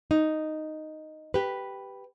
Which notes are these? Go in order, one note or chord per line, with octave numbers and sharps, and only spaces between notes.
D#4
G4 B4